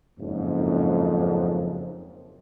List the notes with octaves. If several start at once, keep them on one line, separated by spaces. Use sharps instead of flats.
F#1 F2 G#2